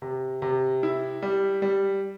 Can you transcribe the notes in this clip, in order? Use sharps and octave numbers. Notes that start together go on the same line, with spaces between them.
C3
C3
E4
G3
G3